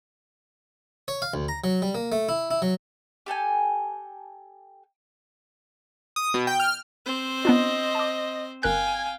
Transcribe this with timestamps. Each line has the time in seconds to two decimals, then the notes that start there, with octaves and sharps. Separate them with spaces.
1.08 C#5
1.22 F5
1.34 D2
1.48 A#5
1.64 F#3
1.82 G3
1.95 A#3
2.12 A3
2.29 E4
2.51 E4
2.62 F#3
3.26 G4 A4 G5 G#5
6.16 D#6
6.34 B2
6.47 G5
6.60 F6
7.05 C4 C5
7.45 B3 D4 F4 D#5
7.95 A5 D6
8.63 G1 A#4 F5 G5 G#5 F#6